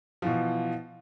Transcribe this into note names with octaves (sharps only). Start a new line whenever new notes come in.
B2 E3 F3